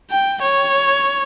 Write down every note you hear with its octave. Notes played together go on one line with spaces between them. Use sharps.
G5
C#5